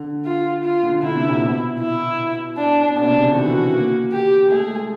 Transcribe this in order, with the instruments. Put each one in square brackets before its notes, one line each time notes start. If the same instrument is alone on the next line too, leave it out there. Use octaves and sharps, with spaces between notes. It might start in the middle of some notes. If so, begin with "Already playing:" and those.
Already playing: [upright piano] D3
[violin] F4
F4
[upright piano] D3
[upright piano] D3 [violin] E4
[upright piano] C3
A#2
B2
[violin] E4
D4
[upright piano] B2 [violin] D4
[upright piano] C3
C#3
D3
[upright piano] D#3 [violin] F#4
[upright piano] E3
A#3
[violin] G4
[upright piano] A3 [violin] G#4
[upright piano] G#3